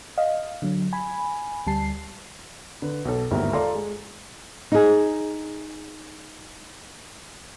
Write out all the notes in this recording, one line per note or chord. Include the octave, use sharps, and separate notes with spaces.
D#5 F5
D3 F#3
G#5 B5
D2 G3 A5 C7
D3 B4
B1 A4
G1 D#2 G#2 E4 F#4 A#4
F4 A4 D5 A#5 C6
G#3
D#4 G#4